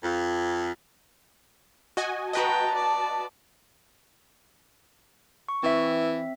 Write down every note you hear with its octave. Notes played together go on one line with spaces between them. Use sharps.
F2
F#4 D#5 G#5
F#4 B4 D#5 G5 A5 A#5
D5
C#6
E3 C4 E5